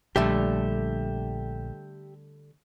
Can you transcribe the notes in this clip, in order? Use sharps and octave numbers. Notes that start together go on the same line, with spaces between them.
A#1 D3 G3 A3 G4 E5